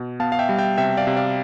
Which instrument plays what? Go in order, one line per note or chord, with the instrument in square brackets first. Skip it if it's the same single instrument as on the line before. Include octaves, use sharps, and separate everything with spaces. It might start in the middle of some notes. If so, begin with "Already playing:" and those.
Already playing: [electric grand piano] B2
B3 F5 A5
F5
E5 G5
G3
E5 G5
C3 E5 G5
D5 F5
C3
D5 F5